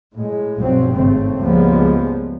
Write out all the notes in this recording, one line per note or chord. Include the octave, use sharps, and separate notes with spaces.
A2 G#3
B1 G2 F3 F#3 C4
G#1 C#3 A3 C4
C#2 F3 G3 G#3 A#3 B3